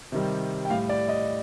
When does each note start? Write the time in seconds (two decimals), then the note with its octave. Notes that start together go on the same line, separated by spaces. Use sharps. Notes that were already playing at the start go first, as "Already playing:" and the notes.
0.12 C3 D#3 G3
0.65 G5
0.70 A2 G3 F5
0.89 D5
1.09 D#5